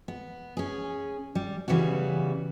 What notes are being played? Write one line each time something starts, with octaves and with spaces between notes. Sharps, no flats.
B3
C#4 G#4
G3
C#3 E3 G3 B3 F#4